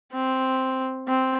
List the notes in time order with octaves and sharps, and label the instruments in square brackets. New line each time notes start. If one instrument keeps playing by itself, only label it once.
[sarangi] C4
C4